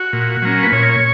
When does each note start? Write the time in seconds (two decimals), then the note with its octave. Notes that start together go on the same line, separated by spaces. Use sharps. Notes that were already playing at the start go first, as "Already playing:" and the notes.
Already playing: F#4
0.13 A#2
0.42 F#3 A#3 C#4
0.63 B4
0.72 A#2 C#5